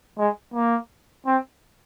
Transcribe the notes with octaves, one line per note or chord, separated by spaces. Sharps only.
G#3
A#3
C4